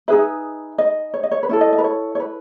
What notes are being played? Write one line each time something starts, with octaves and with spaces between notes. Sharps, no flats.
D#4 G#4 B4 E5
D#5
C#5
D#5
C#5
B4
C#4 E4 A4 C#5
D#5
D#5
B4
C#5
C#5
B4